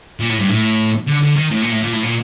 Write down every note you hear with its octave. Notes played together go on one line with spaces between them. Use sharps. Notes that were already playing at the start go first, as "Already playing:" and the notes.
A#2
A2
G2
A2
D3
D3
D#3
A2
A#2
A2
A#2
A2
A#2